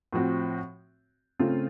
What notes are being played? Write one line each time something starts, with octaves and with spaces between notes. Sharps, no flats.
A2 F3 C4 F#4
C#3 A3 C4 F4